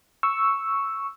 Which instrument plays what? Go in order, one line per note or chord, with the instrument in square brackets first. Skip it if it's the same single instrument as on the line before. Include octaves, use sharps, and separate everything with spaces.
[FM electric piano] C#6 E6